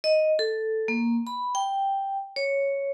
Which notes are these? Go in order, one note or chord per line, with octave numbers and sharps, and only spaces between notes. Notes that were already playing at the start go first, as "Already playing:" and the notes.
D#5
A4
A#3
B5
G5
C#5